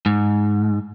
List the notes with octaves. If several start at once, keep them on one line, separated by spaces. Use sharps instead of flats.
G#2